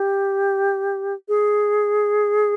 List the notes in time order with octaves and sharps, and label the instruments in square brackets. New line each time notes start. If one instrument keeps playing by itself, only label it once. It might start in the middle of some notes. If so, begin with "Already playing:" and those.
Already playing: [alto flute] G4
G#4